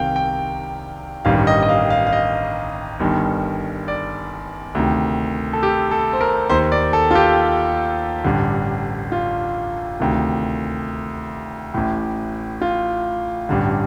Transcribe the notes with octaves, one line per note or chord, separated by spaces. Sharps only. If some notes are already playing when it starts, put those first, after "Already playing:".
Already playing: C2 C3 D#3 F5 G5
G5
A1 G2 D#3 F5
D#5
D#5
F5
F5
F5
D#5
G1 G2 D#3
D5
D2 C3 D#3
A4
G4
A4
C5
A#4
D#2 D#3 C5
D5
A4
F4
G4
A1 G2 D3
F4
D2 C3 D#3
A1 A2
F4
A1 G2 D3